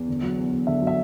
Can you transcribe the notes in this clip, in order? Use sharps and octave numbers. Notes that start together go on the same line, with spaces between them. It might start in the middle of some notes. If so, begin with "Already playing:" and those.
Already playing: E2
D3
F#3
E2
E2
D3 E5
F#3
E5